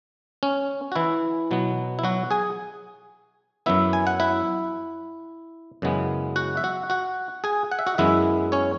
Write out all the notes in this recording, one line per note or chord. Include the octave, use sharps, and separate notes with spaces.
C#4
F#4
E3 E4
B2 F#3 B3
E4
F#3 F#4
G#4 G#5
F#2 F#3 B3 E4 E5
G#5
F#5
E4 E5
F#2 C#3 E3 G#3 B3
F#4 F#5
E5
F#4 F#5
F#4 F#5
G#4 G#5
F#5
E5
F#4 F#5
F#2 E3 G#3 B3 E4 E5
C#4 C#5